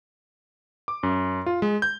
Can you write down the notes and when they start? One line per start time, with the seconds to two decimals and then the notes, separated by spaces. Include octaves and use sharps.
0.88 D6
1.03 F#2
1.46 F4
1.62 G#3
1.82 G6